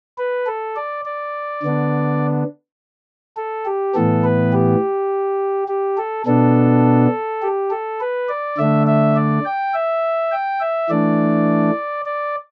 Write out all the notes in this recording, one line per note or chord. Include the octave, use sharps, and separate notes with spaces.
B4
A4
D5
D5
D3 B3 D4
A4
G4
A2 E3 B3 A4
B4
G4
G4
A4
B2 B3 D4 A4
G4
A4
B4
D5
D3 A3 D4 E5
E5
D5
G5
E5
G5
E5
E3 A3 D4 D5
D5